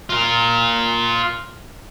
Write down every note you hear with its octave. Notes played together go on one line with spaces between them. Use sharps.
F4 A#4